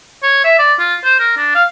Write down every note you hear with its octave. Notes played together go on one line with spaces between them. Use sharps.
C#5
E5
D5
F4
C5
A#4
D4
F5